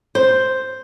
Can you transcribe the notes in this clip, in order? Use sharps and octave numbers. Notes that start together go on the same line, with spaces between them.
C5